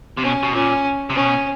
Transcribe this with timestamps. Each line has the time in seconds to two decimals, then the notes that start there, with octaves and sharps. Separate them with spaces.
0.18 C3
0.23 B2 C#4
0.43 B2
0.54 A#2 C#4
1.10 C3
1.15 B2 C#4